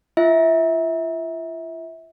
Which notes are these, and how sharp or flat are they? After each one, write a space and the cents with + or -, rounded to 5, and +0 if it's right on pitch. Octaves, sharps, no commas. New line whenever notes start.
F4 -35 E5 -25